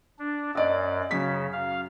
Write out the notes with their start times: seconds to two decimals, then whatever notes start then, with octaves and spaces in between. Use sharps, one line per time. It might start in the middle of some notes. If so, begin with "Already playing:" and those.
0.19 D4
0.55 F#2 D5 D#5
1.11 F#2 C#3 B6
1.53 F5